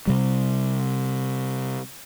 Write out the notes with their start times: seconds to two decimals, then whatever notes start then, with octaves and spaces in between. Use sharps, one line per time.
0.07 C3 G3